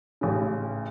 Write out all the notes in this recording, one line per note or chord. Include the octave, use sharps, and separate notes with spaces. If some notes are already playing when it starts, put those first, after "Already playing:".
A1 C#3